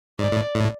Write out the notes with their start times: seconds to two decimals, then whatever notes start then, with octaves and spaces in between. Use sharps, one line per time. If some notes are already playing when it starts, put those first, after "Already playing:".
0.19 G#2 D5
0.32 A2
0.55 A2